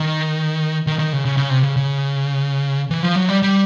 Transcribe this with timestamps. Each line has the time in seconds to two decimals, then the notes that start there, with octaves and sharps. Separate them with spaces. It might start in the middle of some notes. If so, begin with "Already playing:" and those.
Already playing: D#3
0.87 D#3
0.99 D#3
1.13 C#3
1.25 C#3
1.37 C#3
1.50 C3
1.63 C#3
1.76 C#3
2.90 E3
3.03 F3
3.16 F#3
3.29 G3
3.42 G3